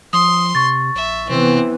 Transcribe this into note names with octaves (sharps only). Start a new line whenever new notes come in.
F3 C6 D#6
C3 C#6 A6
A#1 E5
C3 E3 B3 C4